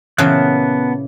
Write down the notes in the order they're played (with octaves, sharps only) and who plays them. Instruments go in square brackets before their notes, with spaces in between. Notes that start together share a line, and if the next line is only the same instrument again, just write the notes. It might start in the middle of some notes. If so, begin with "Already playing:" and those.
[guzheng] A#2 C#3 E3 [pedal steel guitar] B3 A5 F#6